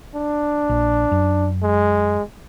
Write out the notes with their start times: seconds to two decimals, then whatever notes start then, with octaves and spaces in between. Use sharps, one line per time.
0.15 D4
0.69 A#1
1.11 F#2
1.63 G#3